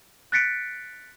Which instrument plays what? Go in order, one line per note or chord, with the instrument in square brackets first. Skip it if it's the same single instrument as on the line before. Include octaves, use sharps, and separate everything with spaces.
[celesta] F#6 A6 B6 C#7 D7